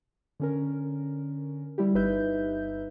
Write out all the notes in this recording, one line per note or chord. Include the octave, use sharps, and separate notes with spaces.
D3 C#4 A#4
G3 E4 G4
G1 D#4 B4 E5 G6